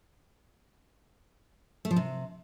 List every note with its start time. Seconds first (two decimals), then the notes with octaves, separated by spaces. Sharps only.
1.85 A3
1.91 F3
1.96 C3